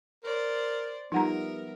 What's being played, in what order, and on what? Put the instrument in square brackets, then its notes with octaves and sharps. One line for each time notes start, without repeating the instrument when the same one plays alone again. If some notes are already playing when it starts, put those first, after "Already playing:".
[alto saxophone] A#4 [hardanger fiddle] C5 D5
[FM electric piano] F3 G3 [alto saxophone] B3 [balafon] D#4 F#5 A#5 [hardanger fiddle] A#4 E5